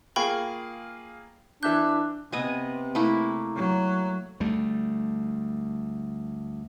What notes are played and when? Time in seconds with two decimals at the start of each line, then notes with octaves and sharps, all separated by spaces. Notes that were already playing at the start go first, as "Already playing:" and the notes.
0.16 A#3 F4 G#4 G5 B5 C#6
1.63 E3 D4 E5 F#6 G6
2.32 C3 B3 D#5 G#5
2.95 A3 A#3 E4
3.56 F#3
4.40 D2 G3 A3